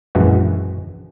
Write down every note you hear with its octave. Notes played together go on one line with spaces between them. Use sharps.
A#1 F#2 E3 G#3 F#4